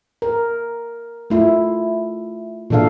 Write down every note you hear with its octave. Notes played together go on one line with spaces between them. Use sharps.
A#4
A3 E4 F4
A#2 E3 D4 A4 F5